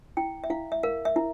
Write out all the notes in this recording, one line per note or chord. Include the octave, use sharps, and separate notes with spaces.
E4 G5
E5
E4 F5
E5
A#4 F5
E5
E4